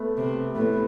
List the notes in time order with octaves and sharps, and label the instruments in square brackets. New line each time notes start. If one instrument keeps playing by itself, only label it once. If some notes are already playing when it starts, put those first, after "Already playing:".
Already playing: [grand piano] A3 B3
[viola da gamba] C3
[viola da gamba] A2 [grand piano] A3 B3